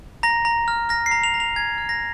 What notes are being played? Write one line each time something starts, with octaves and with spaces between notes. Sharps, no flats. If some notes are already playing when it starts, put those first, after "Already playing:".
A#5 A#6
A#5
F6
F6 A#6
C7
A#5
F7
A#5
F7
G#5 G#6
F6
A#6